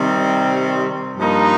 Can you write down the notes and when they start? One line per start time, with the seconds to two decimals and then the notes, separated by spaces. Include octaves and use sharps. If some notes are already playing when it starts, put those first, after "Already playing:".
Already playing: C3 D#3 G3 C4
1.17 G2 F3 A#3 D#4